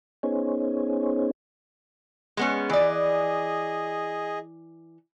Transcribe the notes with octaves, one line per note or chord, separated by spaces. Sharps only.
B3 C#4 D#4 G#4 C5 C#5
G#3 B3 C#4
E3 G#4 D5 D#5